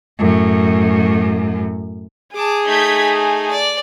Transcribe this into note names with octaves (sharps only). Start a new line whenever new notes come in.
F#2 A2
G#4 A5 D6
A3 D#4 G6 G#6 B6
G#5
D5